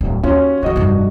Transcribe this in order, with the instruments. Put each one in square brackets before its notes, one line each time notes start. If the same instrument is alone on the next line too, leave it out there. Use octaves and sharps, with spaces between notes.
[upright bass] D1
[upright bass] D#2 [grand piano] C#4 F4 F#4
[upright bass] E3 G3 [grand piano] F#4 D#5
[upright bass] F1 G2